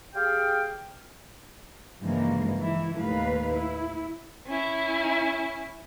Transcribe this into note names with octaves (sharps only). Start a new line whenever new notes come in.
G4 G#4 F5 G5
G2 C#3 E3 F3 G#3 A#3
E3 E4
D#2 A2 A3 B4 F5
E4
C#4 E4